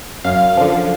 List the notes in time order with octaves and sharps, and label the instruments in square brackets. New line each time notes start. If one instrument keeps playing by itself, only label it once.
[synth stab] F#2 F5
D3 F3